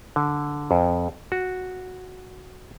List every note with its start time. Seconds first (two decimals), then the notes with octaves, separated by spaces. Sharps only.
0.16 D3
0.71 F2
1.32 F#4